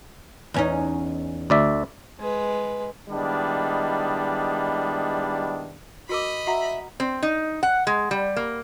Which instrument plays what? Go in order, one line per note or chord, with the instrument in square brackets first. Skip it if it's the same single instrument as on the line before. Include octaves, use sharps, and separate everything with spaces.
[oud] E2 C#4 D#4
[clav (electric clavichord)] D2 D5 E5
[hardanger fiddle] G#3 B4
[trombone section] D#3 G3 G#3 B3 D4 E4
[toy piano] F#4 A#4 D6 [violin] D#5 B5
[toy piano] F#4 F#5 A#5 [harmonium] E5
[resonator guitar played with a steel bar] C4
D#4
F#5
G#3
G3
A#3